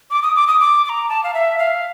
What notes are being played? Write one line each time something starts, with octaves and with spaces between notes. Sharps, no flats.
D6
D#6
D6
D#6
D6
D6
A#5
A5
F5
E5
F5